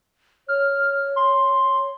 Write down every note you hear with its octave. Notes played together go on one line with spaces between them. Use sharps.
C#5 F6
C6